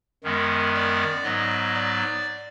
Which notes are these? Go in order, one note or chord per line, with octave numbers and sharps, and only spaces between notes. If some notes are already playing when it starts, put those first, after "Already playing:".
F#2 D#3 G#3 B3
D5
G#2 F#3 B3 D#5
D5